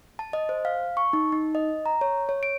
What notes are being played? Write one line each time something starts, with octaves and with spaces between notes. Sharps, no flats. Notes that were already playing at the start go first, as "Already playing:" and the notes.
A5
D#5
C5
F5
C#6
D#4
D#4
D#5
A#5
C#5
C#5
D7